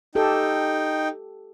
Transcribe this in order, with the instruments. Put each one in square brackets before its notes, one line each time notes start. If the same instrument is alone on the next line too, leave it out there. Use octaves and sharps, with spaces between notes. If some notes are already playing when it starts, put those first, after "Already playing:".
[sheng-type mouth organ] D#4 G5 [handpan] G4 A4